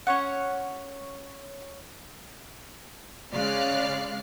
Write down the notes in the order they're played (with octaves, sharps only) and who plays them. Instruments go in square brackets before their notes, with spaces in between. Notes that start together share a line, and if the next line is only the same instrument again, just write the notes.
[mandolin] C#4 C#5 F#5
[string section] C#3 G#3 D5 F5 F6 F#6